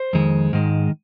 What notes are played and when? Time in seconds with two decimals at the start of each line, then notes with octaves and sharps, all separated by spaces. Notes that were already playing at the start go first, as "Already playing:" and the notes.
Already playing: C5
0.13 F2 D#3 G#3
0.53 G#2 D#3 G#3